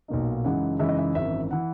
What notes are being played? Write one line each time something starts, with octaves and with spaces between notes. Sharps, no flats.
B1 A#2 A#3 D#4
F#2 C#3 E3 G#3 D#4 F#5
F#2 C#3 E3 G#3 D#4 E5
D#5
E5
G#1 F#2 E3 E5
E3 F#5